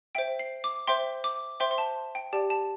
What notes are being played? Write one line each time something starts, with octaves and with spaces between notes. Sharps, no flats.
C5 E5 G5 D7
C7
D6
C5 E5 G5 C6
D6
C5 E5 G5 C6
C6
A5
G5
G4 D5 G5 A5
A5